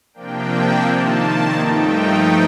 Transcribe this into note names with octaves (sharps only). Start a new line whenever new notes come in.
C3 F3 A#3 D4 G5
C3 D#3 A#3 A5
G2 F3 A3 D#4 G5